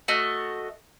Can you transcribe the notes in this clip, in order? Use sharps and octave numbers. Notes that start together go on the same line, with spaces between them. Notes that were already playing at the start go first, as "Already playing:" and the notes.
A3 F#4 D#5